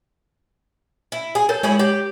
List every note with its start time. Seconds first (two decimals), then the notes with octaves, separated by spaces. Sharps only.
1.12 E4
1.35 G#4
1.49 A4 A#4 C#5 G6
1.63 G#3 C#4 E4 G#4 G#6 F#7
1.79 G4 C#5